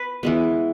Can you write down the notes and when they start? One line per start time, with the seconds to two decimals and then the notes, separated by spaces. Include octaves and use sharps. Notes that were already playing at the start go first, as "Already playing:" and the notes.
Already playing: B4
0.23 E3 G#3 B3